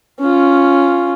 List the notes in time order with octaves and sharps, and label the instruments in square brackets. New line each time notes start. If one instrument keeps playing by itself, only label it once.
[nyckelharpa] C#4 F4